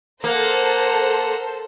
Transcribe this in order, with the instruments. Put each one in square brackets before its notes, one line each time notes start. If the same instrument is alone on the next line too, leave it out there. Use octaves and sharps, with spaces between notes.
[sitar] A#3 [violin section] A4 C5 [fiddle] F#5 A#5